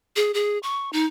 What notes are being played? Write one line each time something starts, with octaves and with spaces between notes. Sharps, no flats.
G#4
G#4
C#6
D#4